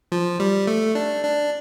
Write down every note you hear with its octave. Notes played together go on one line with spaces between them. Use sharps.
F3
G3
A3
D4
D4